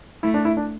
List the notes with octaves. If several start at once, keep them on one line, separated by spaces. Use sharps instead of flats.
A3 E4
D4
E4
D4